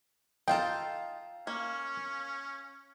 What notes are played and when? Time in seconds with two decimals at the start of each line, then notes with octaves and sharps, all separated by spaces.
0.48 D#4 F4 A4 F5 G5 A5 A#5
1.47 A#3 C#4